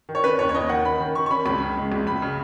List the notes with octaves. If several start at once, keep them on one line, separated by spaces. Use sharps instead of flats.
D#3
C#5
C#4 B4
D#2 C#5
C#5
D#2 D#5
D#3 F#5
C#4 B5
D#3
D#3 C#6
C#6
C#4 B5
C#2 B5
C#3
G#3
C#2
C#2 B5
C#3